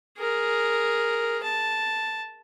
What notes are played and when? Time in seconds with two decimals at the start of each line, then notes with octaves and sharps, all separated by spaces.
0.18 G#4 A#4
1.43 A5